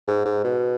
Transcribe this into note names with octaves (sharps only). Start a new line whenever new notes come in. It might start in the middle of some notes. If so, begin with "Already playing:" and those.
G#2
G#2
B2